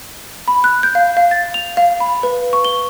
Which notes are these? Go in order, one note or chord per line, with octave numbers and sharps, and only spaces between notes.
B5
F#6
G6
F5
F5
A6
F7
F5
B5
B4
C#6
G7